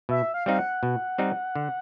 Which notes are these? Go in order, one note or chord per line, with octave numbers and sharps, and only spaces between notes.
B2 E5
F5
G3 C4 D#4 F5
F#5
B2
G3 C4 D#4
D3